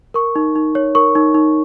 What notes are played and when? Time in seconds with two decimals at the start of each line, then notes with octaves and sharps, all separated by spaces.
0.14 A#4 C#6
0.36 D#4
0.56 D#4
0.75 C#5
0.95 A#4 C#6
1.15 D#4
1.34 D#4